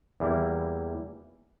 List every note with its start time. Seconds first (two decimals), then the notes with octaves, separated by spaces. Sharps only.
0.20 E2 E3 G3 A#3 E4